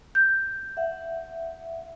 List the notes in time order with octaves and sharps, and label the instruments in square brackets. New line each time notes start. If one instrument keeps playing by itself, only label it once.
[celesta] G6
[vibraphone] E5 F#5